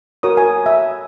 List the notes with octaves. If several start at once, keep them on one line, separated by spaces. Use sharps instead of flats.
F#4 A#4 C#5 D#6
G#5
E5